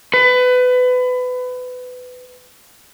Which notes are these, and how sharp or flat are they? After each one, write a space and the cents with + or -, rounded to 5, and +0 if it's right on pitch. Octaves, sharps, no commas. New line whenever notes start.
B4 +25